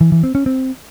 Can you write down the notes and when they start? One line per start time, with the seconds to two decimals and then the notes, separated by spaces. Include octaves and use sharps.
0.01 E3
0.12 E3
0.23 C4
0.35 C#4
0.46 C4